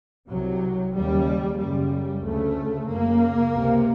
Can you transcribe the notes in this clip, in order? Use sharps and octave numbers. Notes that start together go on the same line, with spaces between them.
C2 C3 F#3
D#2 C#3 G3
F#2 C#3 G3
D2 C#3 A3
F#2 C#3 A#3
C#2 C3